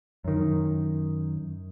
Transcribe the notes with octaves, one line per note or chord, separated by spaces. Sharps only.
F#2 D#3